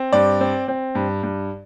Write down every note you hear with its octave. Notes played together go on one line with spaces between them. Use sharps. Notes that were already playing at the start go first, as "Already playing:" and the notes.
Already playing: C4
G2 D5
C4
C4
G2
G2